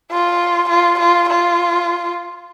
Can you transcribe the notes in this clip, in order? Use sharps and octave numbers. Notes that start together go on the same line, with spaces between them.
F4
F4
F4
F4